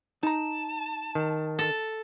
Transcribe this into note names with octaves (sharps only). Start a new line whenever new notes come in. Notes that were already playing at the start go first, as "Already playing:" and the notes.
D#4 A5 A#5
D#3
A4